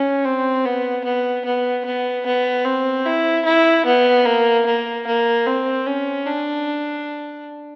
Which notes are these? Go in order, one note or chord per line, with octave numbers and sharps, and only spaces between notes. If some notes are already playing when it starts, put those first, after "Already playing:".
Already playing: C#4
C4
B3
B3
B3
B3
B3
C4
E4
E4
B3
A#3
A#3
A#3
C4
C#4
D4